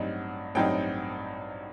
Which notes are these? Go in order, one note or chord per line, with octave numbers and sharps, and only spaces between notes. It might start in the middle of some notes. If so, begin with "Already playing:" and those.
Already playing: A1 G2 F#3 C4 D#4 D#5
A1 G2 F#3 C4 D#4 G5